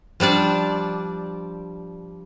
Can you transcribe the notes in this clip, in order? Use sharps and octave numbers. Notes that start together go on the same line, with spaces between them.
F3 G3 D4 D5